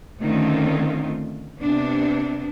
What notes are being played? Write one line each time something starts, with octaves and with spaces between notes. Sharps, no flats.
D3 D#3 A3 C4 C#4 F4
C3 B3 D4